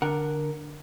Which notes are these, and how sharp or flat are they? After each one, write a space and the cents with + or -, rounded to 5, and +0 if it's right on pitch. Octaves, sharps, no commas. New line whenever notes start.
D3 +0 A#4 +0 F#5 +0